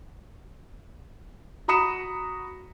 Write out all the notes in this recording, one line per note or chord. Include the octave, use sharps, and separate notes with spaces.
F#4 A#5 B5 D#6 C#7 E7